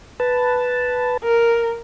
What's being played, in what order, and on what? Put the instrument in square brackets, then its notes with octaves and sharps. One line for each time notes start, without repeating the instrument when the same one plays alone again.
[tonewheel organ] B4 A5
[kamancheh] A#4